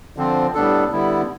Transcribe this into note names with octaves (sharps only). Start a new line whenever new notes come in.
D3 F3 C4
A2 G3 B3 D4 A4
D3 G3 B3 E4